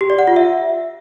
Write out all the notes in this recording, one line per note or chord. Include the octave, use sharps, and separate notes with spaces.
G4
D5
F#5
F4
E5